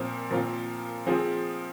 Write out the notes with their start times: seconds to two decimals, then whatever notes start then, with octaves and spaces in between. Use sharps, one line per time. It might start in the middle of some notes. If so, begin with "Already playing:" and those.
Already playing: A#2 F3 C4 F4
0.30 A#2 F3 C4 F4
1.06 F3 C4 F4 G#4